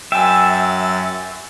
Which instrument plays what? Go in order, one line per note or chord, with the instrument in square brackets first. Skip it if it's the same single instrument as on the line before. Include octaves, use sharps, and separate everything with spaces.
[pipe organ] F#2 A6 [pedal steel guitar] E5 [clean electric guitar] G5 G#5